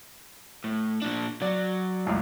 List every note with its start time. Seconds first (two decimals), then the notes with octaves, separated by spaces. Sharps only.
0.64 A2
1.02 A#2 D4
1.42 F#3 D5
2.05 C#2 F#2 A2